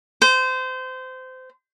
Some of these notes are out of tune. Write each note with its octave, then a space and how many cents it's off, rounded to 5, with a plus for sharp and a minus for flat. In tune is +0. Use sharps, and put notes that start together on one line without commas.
C5 -25